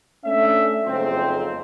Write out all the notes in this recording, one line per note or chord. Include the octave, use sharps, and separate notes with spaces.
A3 C#4 D4 E5
F#1 F2 G#2 C4